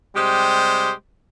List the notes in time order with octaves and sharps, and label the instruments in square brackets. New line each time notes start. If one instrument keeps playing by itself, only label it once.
[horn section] C3 G3 G#3 G4 C5